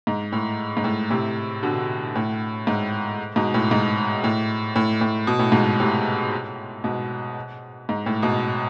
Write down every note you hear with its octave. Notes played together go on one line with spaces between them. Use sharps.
G#2
A2
G#2
A2
A2 C3
B2 D3
A2
G#2
G#2 B2
A2
G#2
A2
A2
A2
B2
A2
G#2 B2
A2 C3
G#2 B2
G#2
A2
G#2 B2